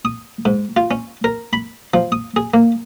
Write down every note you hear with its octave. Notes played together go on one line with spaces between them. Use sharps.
D#6
G#2
F4
C#4
A#4
B5
F3
D#6
G#4
A#3